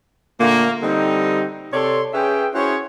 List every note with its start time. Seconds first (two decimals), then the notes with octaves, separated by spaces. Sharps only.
0.40 A#2 D3 A3 A#3
0.82 D3 G3 C4 D#4
1.73 C3 A4 C#5 D5 C6
2.13 C#4 G#4 B4 E5 G5
2.54 C#4 E4 F#4 G#4 C5 C#5